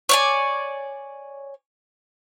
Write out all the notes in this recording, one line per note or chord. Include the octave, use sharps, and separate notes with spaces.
C#5 D5 G#5